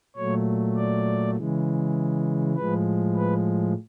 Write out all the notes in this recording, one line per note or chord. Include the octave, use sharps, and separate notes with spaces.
A#2 F#3 A3 C#5
D5
C#3 E3 G#3
A2 F3 G#3 B4
B4